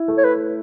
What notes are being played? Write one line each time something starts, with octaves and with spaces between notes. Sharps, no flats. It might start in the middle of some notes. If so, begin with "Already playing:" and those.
Already playing: E4
A3
C#5
B4